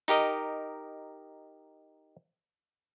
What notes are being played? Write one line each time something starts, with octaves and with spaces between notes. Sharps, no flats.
D#4 G4 A#4 D#5